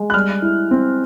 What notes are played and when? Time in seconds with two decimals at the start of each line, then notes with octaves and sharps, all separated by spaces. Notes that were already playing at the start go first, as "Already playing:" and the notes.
Already playing: G#3
0.10 F#6
0.14 G3 F6
0.42 E4
0.71 C4